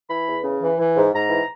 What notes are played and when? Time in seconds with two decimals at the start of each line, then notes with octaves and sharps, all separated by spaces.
0.09 E3 B5
0.27 E2
0.43 C#3
0.61 E3
0.78 E3
0.96 G#2
1.12 G#2 A#5
1.29 E3